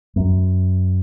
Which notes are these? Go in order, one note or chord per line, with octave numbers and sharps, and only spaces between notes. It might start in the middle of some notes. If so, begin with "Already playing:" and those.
F#2